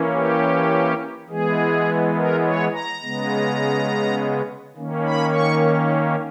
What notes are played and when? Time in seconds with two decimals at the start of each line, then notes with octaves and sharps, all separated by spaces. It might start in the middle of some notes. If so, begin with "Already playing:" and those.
Already playing: E3 A#3 C#4
0.13 G4
1.29 E3 G#3 B3 G#4
2.16 A#4
2.44 C#5
2.73 A#5
3.03 C#3 G#3 B3
4.76 D#3 A#3 C#4
5.06 B5
5.35 C#6